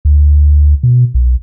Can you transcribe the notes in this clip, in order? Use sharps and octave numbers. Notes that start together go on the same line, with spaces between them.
D2
B2
B1